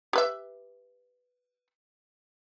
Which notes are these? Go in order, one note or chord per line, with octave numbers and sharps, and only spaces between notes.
G4 B4 E5